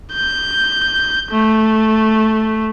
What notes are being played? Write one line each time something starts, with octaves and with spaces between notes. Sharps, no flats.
G6
A3